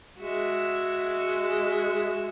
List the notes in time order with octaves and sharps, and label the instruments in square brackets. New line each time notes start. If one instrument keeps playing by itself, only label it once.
[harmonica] G#3 [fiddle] F#4 E5